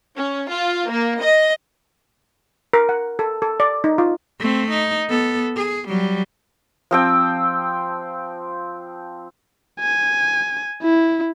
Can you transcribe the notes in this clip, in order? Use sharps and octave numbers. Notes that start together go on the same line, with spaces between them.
C#4
F4
A#3
D#5
A#4
F#5
A4
A4
D5
D#4
F4
A3 C4
D#4
B3 A4
G#4
F#3 G3
F3 C4 G5
G#5
E4